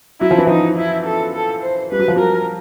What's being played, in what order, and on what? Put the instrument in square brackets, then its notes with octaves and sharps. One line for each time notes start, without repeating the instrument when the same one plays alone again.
[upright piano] F#3 [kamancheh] E4
[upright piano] F3
E3
[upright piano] F3 [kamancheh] D#4
[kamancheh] E4
A4
A4
C5
[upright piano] G3 [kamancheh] B4
[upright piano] F#3
F3
[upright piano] F#3 [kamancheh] A#4